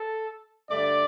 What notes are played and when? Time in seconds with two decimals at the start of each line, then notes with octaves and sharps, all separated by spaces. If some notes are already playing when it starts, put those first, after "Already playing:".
Already playing: A4
0.70 G2 D3 A3 D5